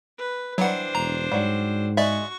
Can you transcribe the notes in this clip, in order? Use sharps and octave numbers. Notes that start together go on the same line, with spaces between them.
B4
E3 F#3 G3 D4 C5 F#5
E1 A#5
G#2 F#3 G3
G#3 F#4 D5 E5 C#6